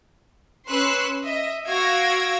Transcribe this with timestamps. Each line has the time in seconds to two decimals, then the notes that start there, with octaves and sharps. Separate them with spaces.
0.68 C#4 B4 C6 E6 F#6 C#7
1.24 D#5 E5
1.67 F#4 F5 E6 G#6 A#6 D7